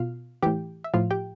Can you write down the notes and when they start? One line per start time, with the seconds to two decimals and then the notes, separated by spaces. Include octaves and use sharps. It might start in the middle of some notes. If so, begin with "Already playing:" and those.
Already playing: B2 F4 F5
0.43 A2 E3 G4 G5
0.84 E5
0.94 A2 F3 F4 F5
1.11 G4 G5